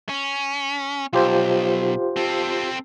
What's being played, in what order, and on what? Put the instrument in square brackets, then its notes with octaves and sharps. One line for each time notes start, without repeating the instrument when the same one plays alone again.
[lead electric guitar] C#4
[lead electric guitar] B1 [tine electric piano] F4 G4 C5
[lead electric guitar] C4 A4